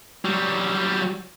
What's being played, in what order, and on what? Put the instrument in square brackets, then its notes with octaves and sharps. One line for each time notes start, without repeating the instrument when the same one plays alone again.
[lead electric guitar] F#3 G3